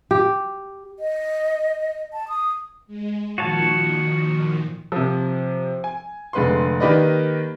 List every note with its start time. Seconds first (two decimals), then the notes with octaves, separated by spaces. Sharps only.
0.11 G4
0.99 D#5
2.13 A5
2.28 D#6
2.87 G#3
3.38 A#2 D#3 F3 F#4 C#5 A5
4.92 C3 F3
5.84 G#5
6.33 F1 D3 G#3 B4 F5 C6
6.80 D#3 A#3 G4 B4 D5 D#5